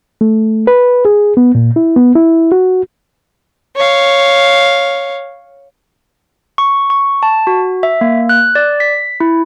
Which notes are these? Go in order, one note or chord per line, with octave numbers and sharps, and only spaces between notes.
A3
B4
G#4
B3
A#2
E4
B3
E4
F#4
C#5 F5
C#6
C#6
A5
F#4
E5
A#3
F#6
D5
B6
E4